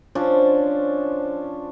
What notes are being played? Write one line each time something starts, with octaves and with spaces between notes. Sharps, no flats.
F3 C#4 D4 C5